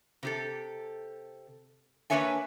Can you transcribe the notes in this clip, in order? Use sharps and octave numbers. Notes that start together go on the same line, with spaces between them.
C3 G4 A4
A#3 D4 B4 C#5 E5 G#5